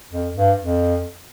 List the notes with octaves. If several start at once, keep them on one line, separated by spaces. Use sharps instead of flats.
F2
G2
F2